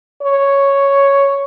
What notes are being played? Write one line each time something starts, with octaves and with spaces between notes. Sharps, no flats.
C#5